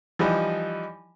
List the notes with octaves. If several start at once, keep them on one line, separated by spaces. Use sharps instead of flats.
E3 F3 G3 D#4